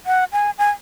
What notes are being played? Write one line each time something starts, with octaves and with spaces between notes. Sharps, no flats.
F#5
G#5
G#5